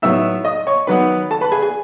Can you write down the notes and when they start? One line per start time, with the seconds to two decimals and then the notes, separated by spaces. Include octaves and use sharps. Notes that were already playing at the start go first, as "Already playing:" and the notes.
0.02 A2 F#3 B3 D#4 E5 E6
0.45 D#5 D#6
0.67 C#5 C#6
0.87 D#3 F#3 B3 D#4 B4 B5
1.31 A4 A5
1.41 B4 B5
1.52 G#4 G#5
1.62 G#4 G#5